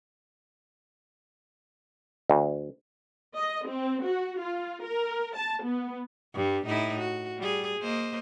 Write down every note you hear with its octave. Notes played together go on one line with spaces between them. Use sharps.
D2
D#5
C4
F#4
F4
A#4
A5
B3
G2 G3
A2 D#4 E4
F#4
G3 G#4
A#3 C5 D#5